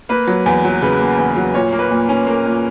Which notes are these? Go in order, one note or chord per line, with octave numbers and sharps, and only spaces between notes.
A#3 B4
F#3
E2
F#3
C#3 B4
A#3
E2
F#3
A#2 C#5
A#3
B4
A#2
C#4
A#3 A#4
A#2